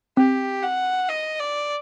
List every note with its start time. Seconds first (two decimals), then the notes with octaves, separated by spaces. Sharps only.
0.17 C4 G4
0.63 F#5
1.09 D#5
1.40 D5